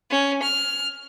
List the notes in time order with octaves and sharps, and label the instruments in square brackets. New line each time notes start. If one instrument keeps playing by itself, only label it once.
[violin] C#4
F6